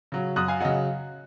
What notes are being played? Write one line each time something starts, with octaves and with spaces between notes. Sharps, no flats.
C#3 F#3
F#2 D#6 F#6
F5 G#5
C#3 F#3 D#5 F#5